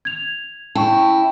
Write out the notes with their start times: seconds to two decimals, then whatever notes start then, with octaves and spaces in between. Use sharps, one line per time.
0.05 G#6 F7
0.75 C#4 E4 G5 A5 C#6